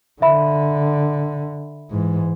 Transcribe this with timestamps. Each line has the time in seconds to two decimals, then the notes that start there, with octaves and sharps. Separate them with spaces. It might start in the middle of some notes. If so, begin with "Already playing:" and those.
0.22 D3 E5 B5
1.90 G#2 E3